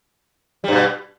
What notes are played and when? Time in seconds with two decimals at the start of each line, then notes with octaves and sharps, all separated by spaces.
0.64 G3
0.68 G2
0.72 B2